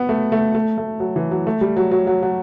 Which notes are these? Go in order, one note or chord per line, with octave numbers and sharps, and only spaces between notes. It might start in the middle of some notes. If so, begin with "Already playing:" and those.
Already playing: B3
A3
A3
A3
A3
F#3
E3
F#3
A3
G3
F#3
F#3
F#3
F#3